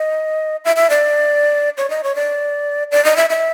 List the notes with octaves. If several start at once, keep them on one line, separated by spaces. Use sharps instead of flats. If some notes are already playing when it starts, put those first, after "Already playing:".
Already playing: D#5
E5
E5
D5
C#5
D#5
C#5
D5
D5
D#5
E5
E5